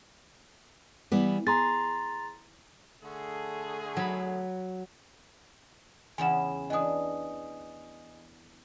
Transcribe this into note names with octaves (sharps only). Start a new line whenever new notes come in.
E3 G3 B3
G#4 A#5 C6 A6
D3 A3 G#4
F#3 B5
E2 C#3 E4 G#5 E7
E3 D4 D#5 G#5 D#6